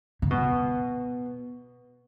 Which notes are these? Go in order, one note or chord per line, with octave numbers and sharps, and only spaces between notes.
C#3
B2